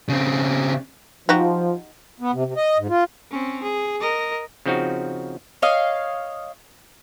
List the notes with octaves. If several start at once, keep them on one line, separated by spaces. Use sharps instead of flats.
C#3 C4
F3 D#4 F#4 G4
B3
C3
C3
D#5
G#2
F4
C4 C#4
G#4
A#4 D#5
C#3 F3 C4 D#4 F#4
C#5 D#5 F5